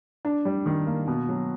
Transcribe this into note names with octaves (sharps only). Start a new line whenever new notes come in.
D4
G3
D#3
A#3
B2
F#3